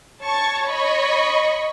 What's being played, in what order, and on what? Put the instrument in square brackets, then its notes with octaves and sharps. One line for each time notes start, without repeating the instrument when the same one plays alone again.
[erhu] C#5 [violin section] A5 C#6 A6
[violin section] D#5 B5 C#6